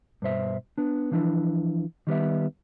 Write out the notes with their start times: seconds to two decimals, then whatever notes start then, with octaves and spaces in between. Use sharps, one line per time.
0.22 G2 B2 C5 E5
0.78 B3 D4
1.11 E3 F3 D4 E4
2.07 D#3 G3 B3 E5